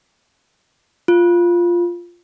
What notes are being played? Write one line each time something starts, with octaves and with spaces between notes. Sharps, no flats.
F4